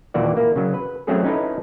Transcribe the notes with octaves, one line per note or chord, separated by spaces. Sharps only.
D#2 A#2 E3 A#3 F#4 D5
A#3 E4
C#3 F#3
B4
F#3 A3 C4 C#4 G#4 A4
C#4 D#4 E4 A4 B4